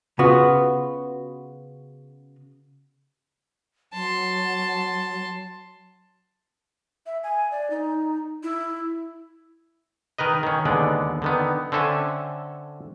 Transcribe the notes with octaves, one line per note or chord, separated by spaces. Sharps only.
C#3 B3 F4 F#4
F#3 A5 C6
E5
G#5
D5
D#4
E4
D#3 A#4 B4 D#5
D#3 C#4
D#2 D3 G#3 B3 D5
D3 D#3 B3
D3 C4 C#4 A4 E5 G#5